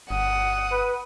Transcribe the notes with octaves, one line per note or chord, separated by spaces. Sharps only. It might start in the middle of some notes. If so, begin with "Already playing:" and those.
G1 F#5 D#6
B4